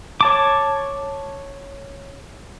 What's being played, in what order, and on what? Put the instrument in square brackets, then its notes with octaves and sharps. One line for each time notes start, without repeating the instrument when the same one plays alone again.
[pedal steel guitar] C#5 A5 D6